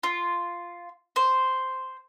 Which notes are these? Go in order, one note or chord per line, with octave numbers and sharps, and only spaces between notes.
F4
C5